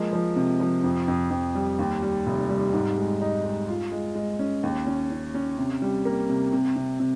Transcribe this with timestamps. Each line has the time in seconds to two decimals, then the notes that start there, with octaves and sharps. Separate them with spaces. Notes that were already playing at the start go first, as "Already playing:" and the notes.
Already playing: F3 G#3 A#3
0.13 F3
0.36 C3
0.60 F3
0.84 F2
1.08 F2
1.31 F2
1.55 G3
1.79 D#2
2.02 G3
2.26 F1
2.49 G3
2.73 G#2
2.98 G#3
3.21 D#4
3.45 G#3
3.68 F4
3.92 G#3
4.15 G#3
4.39 C#4
4.63 D#2
4.87 C#4
5.10 C#4
5.34 C#4
5.58 C3
5.82 G3
6.05 A#3
6.29 C3
6.53 C3
6.76 C3
7.00 C3